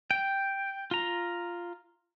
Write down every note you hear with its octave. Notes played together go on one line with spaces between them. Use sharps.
G5
F4 A#5